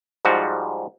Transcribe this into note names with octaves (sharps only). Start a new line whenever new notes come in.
G#2 F3 G3 F#4